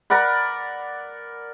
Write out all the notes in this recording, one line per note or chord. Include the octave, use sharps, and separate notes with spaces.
A#4 D5 F#5 B5